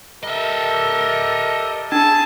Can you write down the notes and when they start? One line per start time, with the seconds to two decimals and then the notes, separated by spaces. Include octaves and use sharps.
0.23 G4 A4 A#4 D#5 E5
1.92 D4 G#4 A5